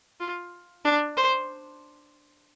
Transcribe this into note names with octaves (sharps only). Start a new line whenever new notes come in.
F4
D4
C5